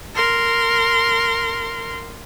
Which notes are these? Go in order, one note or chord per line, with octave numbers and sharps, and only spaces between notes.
A#4 C6